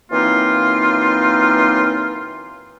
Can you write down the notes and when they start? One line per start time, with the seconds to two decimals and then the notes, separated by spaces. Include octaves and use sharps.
0.11 F#2 E3 A#3 C4 D#4 F4